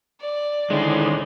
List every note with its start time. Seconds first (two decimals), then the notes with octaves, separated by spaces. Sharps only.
0.20 D5
0.70 A2 D3 D#3 G#3 C#4 C5